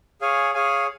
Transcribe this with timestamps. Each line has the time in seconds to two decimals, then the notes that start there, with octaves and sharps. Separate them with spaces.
0.21 G#4 C#5 F5 G#5
0.54 G#4 C#5 F5 G#5